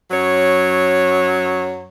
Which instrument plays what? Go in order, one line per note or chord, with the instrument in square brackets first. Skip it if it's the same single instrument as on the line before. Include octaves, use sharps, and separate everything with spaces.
[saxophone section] F#2 F#3 C#5